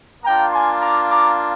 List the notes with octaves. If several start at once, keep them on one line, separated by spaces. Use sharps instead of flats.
A#3 D4 F4 G5 A#5
G#5 C6
A#5 D6
A#5 D6